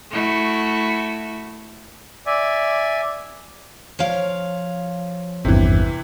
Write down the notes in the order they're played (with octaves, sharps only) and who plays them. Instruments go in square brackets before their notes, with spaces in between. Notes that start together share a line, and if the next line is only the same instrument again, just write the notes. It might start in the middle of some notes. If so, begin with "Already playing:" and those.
[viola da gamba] A3 E4 F#4
[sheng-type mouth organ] D5 E5 G#5
[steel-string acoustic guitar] F3 C#5 F5
[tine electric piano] G#1 E2 G2 [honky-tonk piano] C3 E3